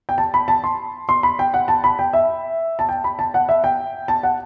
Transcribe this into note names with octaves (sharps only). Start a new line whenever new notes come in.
G5
A5
B5
A5
C6
C6
B5
G5
F#5
A5
B5
G5
E5
A5
G5
B5
A5
F#5
E5
G5
A5
F#5